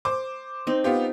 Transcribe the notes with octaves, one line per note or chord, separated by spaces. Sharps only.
C5 D6
C4 D#4
B3 F4 G4